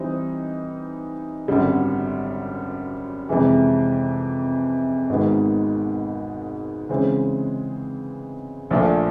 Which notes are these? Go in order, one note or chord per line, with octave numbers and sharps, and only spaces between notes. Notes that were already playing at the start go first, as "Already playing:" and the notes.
Already playing: E3 G3 C4 D#4
G#1 F#2 D3 G3
F2 C3 E3 G#3
G#1 G#2 D#3 G#3 B3
C#3 E3 G#3 C4
A#1 A#2 F3 A3 D4